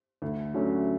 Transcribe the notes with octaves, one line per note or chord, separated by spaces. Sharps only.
D2
D3 F#3 A3 C#4